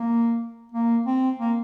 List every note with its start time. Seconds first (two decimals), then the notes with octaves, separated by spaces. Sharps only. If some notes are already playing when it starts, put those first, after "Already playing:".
Already playing: A#3
0.72 A#3
1.06 C4
1.40 A#3